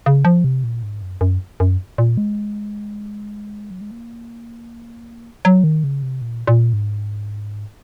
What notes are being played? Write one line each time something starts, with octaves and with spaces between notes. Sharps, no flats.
C#3
F3
C3
A#2
G#2
F#2
F#2
F#2
A#2
G#3
F#3
G#3
A#3
F#3
D#3
C#3
C3
A#2
A#2
G#2